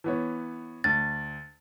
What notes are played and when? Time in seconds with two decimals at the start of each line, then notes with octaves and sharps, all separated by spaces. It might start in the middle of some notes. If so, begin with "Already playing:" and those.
0.04 E3 B3 C#5
0.84 D2 A6